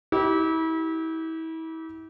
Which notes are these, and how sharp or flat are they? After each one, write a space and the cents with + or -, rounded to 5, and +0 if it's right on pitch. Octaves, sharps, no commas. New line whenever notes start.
E4 -35 G4 -25